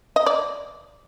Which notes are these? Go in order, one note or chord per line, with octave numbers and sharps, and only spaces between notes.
D#5
D5